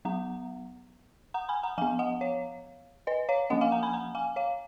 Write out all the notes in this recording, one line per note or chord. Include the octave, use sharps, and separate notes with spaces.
F#3 B3 F#5 A#5
F#5 A#5
G#5 B5
F#5 A#5
F3 B3 F5 G#5
D#5 F#5
C#5 F5
B4 D#5
C#5 F5
F3 A#3 C#4 D#5 F#5
F5 G#5
F#5 A#5
G#5 B5
F#5 A#5
F5 G#5
C#5 F5